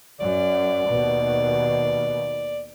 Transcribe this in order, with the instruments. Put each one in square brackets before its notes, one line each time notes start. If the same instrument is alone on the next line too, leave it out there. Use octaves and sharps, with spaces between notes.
[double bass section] F#2 [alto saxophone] D5
[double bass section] D#2 B2